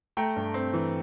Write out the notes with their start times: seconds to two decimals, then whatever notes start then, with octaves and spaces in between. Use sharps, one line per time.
0.17 A3 G5 A#5
0.36 G2
0.54 C4
0.73 E3